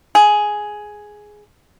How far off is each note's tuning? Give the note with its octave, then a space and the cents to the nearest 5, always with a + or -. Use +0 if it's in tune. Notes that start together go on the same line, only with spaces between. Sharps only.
G#4 +5